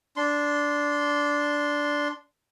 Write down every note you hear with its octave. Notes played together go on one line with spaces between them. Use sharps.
D4 C6